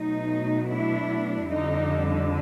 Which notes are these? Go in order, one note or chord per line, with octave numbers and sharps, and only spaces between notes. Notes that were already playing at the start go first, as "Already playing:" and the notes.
Already playing: B2 F#3 A3 D#4
D4 E4
F2 D3 G3 D#4